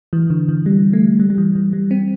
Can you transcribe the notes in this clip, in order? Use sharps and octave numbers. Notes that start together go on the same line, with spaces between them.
E3
D3
E3
G3
A3
G3
G3
E3
E3
G3
C4